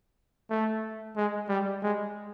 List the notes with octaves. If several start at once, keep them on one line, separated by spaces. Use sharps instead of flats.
A3
G#3
G3
G#3